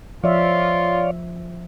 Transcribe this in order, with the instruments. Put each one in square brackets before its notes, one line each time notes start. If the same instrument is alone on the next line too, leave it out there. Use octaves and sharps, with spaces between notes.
[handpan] F3 E5 [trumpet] F4 [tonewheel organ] C#5 D5 F5